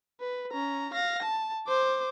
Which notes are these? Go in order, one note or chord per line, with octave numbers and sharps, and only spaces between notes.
B4
C#4 A#5
F5 A#6
A5
C5 D6